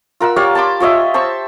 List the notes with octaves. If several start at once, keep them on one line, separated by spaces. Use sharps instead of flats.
F4 A#4 F#5 E6
G4 C#5 D5 F5
A5 B5 C6 D6
F4 C#5 D#5 E5
C5 A5 C#6 E6